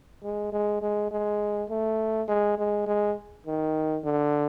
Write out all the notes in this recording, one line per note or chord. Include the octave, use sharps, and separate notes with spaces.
G#3
G#3
G#3
G#3
A3
G#3
G#3
G#3
D#3
D3